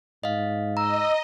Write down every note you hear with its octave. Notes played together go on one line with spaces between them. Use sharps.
G#2 D#5 F5
D#5 A#5 E6